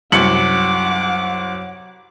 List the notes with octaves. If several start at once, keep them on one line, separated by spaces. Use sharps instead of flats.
C2 F#2 F#5 D6 C#7 F#7